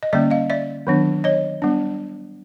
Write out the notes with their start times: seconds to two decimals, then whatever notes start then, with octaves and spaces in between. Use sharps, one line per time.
0.03 D#5
0.13 D3 G3 A#3 C#4 D5 E5
0.30 D#5 F5
0.50 D5 E5
0.87 D#3 F#3 B3 D4
1.24 C#5 D#5
1.62 G3 B3 D4